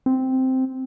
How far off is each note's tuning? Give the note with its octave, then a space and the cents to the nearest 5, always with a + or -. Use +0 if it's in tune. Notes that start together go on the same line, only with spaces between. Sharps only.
C4 -5